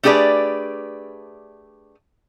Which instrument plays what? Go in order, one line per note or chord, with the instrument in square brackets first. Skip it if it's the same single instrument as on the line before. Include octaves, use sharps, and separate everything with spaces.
[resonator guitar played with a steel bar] A3 D4 G4 G#4 B4 D5